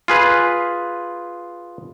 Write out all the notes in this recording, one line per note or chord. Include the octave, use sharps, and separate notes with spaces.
F4 G#4 B4